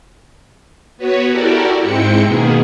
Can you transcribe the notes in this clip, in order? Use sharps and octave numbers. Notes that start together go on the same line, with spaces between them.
B3 F#4 B4 C#5
E4 F#4 G4 A4 A#4 D5
G#2 G#3 C4 E4 G5 C#7
B2 D#3 A#3 B3 G#4